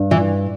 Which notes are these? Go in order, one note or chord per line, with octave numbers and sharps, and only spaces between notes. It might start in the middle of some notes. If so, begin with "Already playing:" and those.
Already playing: G2
E3